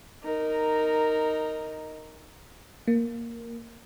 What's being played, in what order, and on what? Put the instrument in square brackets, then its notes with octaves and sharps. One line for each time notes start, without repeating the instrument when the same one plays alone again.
[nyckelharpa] D#4 A#4
[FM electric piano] A#3